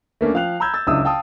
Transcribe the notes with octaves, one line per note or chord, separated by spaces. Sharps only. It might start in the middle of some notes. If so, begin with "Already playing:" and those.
A3 A#3 C#4 D4
F3 F5 G5 F#6 F7
A#5 B5 E6 G6 G#6
E6 A6
F#1 C#2 D4 E4 D#6 E6
F5 G5 A5 D#6